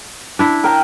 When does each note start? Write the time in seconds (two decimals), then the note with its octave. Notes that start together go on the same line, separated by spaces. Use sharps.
0.39 D4 E4
0.64 A#4 G5 A#5